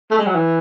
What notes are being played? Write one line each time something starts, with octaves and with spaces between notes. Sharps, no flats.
A3
G#3
F#3
E3